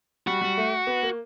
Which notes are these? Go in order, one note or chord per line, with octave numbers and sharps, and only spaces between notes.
G3 F#4
G3
A3
B3
A#3